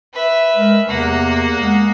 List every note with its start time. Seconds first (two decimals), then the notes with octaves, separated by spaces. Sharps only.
0.14 B4 E5
0.56 G#3 A#4
0.88 E2 C3 A#3 F#5
1.60 G#3 B3